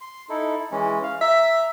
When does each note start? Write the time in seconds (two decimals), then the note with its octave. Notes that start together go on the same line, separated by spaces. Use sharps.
0.01 C6
0.29 D#4 E4 A4
0.72 E3 G#3 C#4
1.03 F5
1.21 E5 A#5